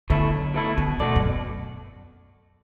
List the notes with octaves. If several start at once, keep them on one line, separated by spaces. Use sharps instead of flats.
B2 D3 A3 E4
B1
B2 A3 E4
B2 D3
B2 A3 F#4 A4 D5
F#2
B2